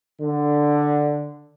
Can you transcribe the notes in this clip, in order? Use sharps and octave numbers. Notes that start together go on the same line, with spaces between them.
D3